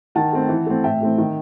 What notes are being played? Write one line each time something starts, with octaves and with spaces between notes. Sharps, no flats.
D#3 F#5 A5
A3 C4
E3
A3 C4
A2 E5 G5
E3 A3 C4
D#3